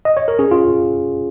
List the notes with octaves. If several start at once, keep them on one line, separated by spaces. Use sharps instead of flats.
D#5
C#5
A#4
C#4 G#4
F4